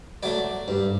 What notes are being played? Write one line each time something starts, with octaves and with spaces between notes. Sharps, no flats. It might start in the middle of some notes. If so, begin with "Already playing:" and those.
F#3 A3 D5
G2